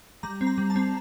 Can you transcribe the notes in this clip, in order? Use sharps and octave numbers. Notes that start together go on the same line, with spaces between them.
G3 A#5
C4
A#5
G3
A5
C4